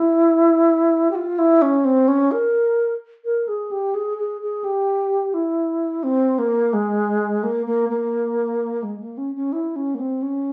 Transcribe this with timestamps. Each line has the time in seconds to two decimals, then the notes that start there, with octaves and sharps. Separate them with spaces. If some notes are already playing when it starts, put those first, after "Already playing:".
Already playing: E4
1.11 G4
1.15 F4
1.39 E4
1.62 C#4
1.85 C4
2.08 C#4
2.32 A#4
3.25 A#4
3.48 G#4
3.71 G4
3.94 G#4
4.18 G#4
4.41 G#4
4.64 G4
5.34 E4
6.03 C4
6.39 A#3
6.73 G#3
7.43 A#3
7.67 A#3
7.90 A#3
8.83 G#3
9.00 A#3
9.18 C#4
9.35 C#4
9.53 E4
9.76 C#4
9.95 A#3
9.99 C4
10.22 C#4